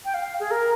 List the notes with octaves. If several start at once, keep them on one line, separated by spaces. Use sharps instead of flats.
G5
F5
G#4
A#4